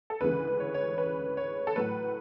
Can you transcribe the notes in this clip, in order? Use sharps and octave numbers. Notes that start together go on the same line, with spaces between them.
A4
D2 C#3 E3 G#3 B4
C#5
C#5
B4
C#5
A4
A2 F#3 A3 B4